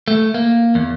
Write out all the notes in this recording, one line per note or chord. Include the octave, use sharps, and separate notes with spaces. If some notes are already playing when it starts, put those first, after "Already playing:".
A3
A#3
E2